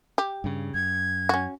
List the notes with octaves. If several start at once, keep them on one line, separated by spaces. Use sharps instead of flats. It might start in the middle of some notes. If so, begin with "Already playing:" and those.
G4
G2 C#3
F#2 G#6
C#4 F#4